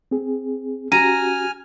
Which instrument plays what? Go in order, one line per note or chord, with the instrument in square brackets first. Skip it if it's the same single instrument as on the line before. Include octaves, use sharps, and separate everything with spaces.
[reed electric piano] C4 G#4
[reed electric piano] C#4 F#4 G4 [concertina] G#5 F6 [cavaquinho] A#5 [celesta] D#7